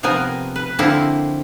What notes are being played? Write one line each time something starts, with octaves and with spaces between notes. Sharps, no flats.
C3 F3 B3 A#4 G#5
B4
D3 F3 A#3 C4 E4